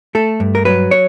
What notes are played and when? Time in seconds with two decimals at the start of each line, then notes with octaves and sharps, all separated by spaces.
0.15 A3 A4
0.40 G2
0.55 A#4
0.65 F#3 B4
0.91 C#5